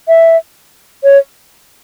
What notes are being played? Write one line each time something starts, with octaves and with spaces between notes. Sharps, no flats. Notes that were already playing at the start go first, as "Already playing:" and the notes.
E5
C#5